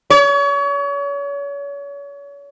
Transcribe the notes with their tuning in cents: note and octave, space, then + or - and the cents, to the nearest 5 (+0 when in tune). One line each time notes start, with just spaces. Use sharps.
C#5 +35